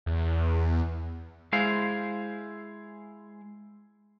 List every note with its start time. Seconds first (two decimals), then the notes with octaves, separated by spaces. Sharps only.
0.06 E2
1.53 G#3 E4 G#4 C5 F5